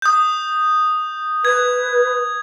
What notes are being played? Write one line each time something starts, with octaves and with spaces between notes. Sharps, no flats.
D#6 G6
B4 G#6